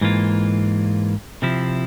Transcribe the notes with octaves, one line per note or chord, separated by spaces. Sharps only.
G#2 E3 A#3 F4
C3 F3 C4 E4